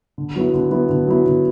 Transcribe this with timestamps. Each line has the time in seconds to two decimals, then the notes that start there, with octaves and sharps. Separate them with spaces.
0.18 D3
0.36 F#3 B3 E4
0.53 D3
0.71 F#3 B3 E4
0.90 D3
1.07 F#3 B3 E4
1.26 D3